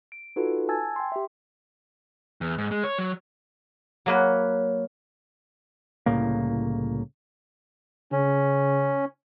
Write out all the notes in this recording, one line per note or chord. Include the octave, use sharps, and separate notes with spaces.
D7
D#4 F4 F#4 A4 B4
G#5 A5 E6 G#6 A6
G5 C6
G4 E5
E2
G#2
G#3
C#5
F#3
F#3 A#3 B4
C2 A2 C#3 A#3
C#3 C#4